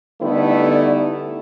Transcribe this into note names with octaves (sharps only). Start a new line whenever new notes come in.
D3 G3 A3 B3 D#4 E4